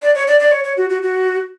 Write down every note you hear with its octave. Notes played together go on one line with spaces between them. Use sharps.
D5
C#5
D5
D5
C#5
C#5
F#4
F#4
F#4